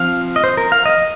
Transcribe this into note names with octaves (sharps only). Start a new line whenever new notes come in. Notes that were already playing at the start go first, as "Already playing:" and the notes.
Already playing: F3 C4 F5
D#5
C5
A#4
F5
D#5